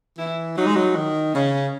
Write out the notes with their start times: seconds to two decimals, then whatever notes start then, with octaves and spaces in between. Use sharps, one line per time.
0.18 E3 E4
0.57 F#3 D#4
0.66 G#3
0.75 F#3
0.96 D#3
1.34 C#3 C#4